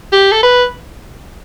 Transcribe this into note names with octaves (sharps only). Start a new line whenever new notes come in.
G4
A4
B4